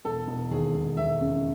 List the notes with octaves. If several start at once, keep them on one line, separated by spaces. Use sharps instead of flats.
E1 A4
E1
D#2 G#4
E1
E1 E5
C#3